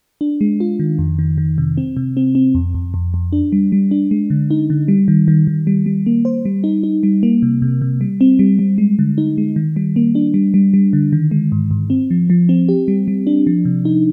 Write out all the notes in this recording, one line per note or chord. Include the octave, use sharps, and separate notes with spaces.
D4
G#3
F4
D#3
F2
D#3
D#3
C3
C4
C3
C4
C4
F2
F2
F2
F2
D4
G3
G3
D4
G#3
D3
D#4
D3
G3
D#3
D#3
D#3
G3
G3
A#3
C5
G3
D#4
D#4
G3
A#3
C3
C3
C3
G3
C4
G3
G3
G#3
D3
D#4
G#3
D#3
G3
A#3
D4
G3
G3
G3
D3
D#3
G#3
G#2
G#2
C4
F3
F3
C4
G4
G3
G3
D4
F3
C3
D#4